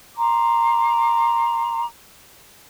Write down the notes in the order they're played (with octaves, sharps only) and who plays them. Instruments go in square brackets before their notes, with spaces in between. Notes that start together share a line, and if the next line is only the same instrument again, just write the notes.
[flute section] A#5 C6 D6